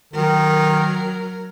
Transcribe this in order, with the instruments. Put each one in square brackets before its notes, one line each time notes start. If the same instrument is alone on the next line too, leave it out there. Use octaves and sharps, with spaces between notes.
[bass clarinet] D#3 [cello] F#3 A#4